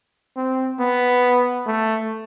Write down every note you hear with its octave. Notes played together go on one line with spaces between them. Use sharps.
C4
B3
A3